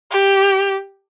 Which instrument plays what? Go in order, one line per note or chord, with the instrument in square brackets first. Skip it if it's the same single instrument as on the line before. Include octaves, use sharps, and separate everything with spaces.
[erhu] G4